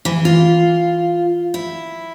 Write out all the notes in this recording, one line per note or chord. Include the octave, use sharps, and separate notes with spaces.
E3
F4
E4